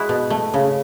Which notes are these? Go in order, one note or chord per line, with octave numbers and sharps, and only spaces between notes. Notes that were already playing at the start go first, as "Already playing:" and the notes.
Already playing: G#3 E4 F#4
B2
A3
C#3